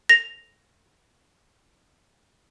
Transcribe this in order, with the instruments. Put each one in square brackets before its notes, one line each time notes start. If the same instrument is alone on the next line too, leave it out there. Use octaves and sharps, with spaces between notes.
[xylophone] A#6 F7